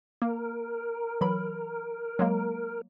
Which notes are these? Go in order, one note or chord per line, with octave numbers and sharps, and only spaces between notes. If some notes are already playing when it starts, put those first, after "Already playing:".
A#3 A#4
E3 F#3 B5
F#3 G#3 A#3